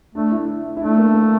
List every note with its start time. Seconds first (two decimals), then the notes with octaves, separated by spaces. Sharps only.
0.15 A3 D4
0.31 E4
0.77 E4
0.81 A3 D4
0.98 A#3
1.14 A#3